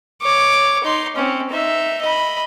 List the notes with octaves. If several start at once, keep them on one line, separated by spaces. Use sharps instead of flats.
C#5 D6
D#4 C6
C4 C#4
D#4 E5
D#5 B5